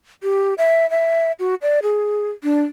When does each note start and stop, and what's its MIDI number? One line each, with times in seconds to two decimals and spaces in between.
0.23 0.54 67
0.58 0.89 76
0.90 1.32 76
1.40 1.55 66
1.62 1.80 74
1.83 2.30 68
2.43 2.62 62